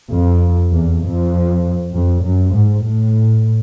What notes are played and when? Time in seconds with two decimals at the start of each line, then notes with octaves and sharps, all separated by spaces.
0.12 F2
0.72 E2
1.03 F2
1.93 F2
2.24 F#2
2.54 G#2
2.83 A2